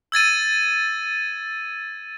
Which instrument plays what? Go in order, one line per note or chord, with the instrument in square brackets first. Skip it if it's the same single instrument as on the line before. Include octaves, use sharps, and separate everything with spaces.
[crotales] E6 G#6 A6 D#7